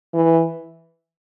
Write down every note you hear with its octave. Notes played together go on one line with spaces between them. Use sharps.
E3